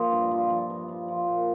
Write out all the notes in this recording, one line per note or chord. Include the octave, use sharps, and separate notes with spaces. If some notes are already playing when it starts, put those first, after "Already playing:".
Already playing: A#2 F3 D#5
G2
F3
F3
G2
F3
F3
A#2